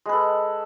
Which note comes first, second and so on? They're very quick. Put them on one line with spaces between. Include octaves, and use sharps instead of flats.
G#3 B4 A4